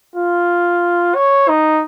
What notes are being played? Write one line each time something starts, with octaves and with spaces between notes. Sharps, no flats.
F4
C#5
D#4